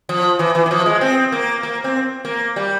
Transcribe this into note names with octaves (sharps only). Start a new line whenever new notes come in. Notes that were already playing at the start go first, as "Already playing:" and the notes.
F3
E3
E3
E3
F3
G#3
C4
A#3
A#3
C4
A#3
G3